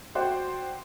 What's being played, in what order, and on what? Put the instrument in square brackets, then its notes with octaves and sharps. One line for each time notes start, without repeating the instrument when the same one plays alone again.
[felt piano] F#4 C5 D5 F#5 G5